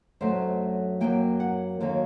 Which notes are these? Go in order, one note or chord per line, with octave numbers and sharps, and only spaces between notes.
F#2 D3 F#3 A3 C5
F#2 F#3 A#3 G5
F#5
D#2 D3 F#3 A#3